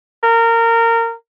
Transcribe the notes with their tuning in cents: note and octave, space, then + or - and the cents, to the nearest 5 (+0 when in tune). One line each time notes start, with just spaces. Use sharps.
A#4 -20